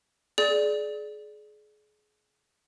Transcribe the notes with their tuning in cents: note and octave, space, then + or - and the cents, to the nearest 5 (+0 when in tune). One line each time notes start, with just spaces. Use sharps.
G#4 +30 D5 +0